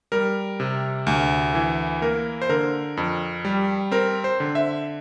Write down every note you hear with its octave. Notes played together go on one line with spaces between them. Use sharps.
G3 A#4
C3
D2
E3
A#3 A#4
C5
D3 A#4
F2
G3
C4 A#4
C5
D3
E5